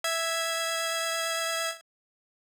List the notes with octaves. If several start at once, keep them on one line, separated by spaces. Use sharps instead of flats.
E5 G#6